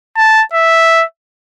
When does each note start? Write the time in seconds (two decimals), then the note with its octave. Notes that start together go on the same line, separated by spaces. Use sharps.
0.17 A5
0.53 E5